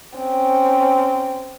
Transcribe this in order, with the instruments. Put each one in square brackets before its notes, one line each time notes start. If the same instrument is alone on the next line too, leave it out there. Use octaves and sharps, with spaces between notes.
[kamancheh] C4 C#4